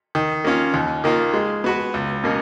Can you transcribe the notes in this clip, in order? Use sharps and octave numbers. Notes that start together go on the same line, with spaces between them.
D#3
A#3 C#4 F4
D#2
D#3 A#3 F4
G#3
B3 F#4 B4
C#2
B2 A#3 C#4